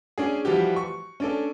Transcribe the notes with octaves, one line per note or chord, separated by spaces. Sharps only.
C#4 D4 G#4
E3 F3 G3 F#4 G4
C#6
C#4 D4 A4